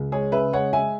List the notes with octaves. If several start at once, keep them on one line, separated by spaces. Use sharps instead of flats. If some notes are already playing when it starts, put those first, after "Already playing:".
Already playing: C#2
G#3 G#4 C#5
C#3 B4 E5
G#3 C#5 F#5
G#3 E5 G#5